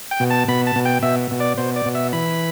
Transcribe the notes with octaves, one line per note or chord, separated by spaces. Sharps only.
G5
B2
A5
B2 B5
A5
B2
G5
B2 E5
B2
D5
B2 C5
D5
B2
E5
E3 B5